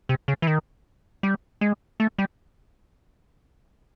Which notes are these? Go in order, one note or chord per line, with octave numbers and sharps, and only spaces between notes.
C3
C#3
E3
D#3
G3
G#3
A3
G3